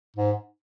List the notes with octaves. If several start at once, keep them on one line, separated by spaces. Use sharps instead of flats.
G#2